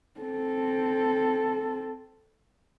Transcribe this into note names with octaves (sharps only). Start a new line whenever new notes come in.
C4 A4